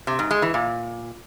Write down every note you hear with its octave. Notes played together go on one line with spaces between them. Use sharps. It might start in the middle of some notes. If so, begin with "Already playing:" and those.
C3
G#2
G#3
E3
A#2